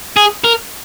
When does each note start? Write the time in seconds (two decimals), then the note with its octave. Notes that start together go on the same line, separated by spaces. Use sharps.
0.17 G#4
0.44 A#4